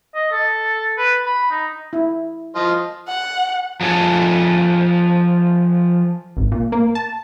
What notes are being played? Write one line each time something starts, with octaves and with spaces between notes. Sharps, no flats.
D#5
A4
B4
B5
D#4
E4
F3 F4 D#5
F#5
F3 G#4 A4
G#1
A#2
A#3
A5